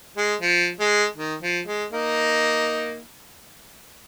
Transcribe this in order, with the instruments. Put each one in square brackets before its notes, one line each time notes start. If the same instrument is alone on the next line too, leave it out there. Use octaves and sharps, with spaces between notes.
[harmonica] G#3
F3
G#3
D#3
F3
G#3
A#3 D#4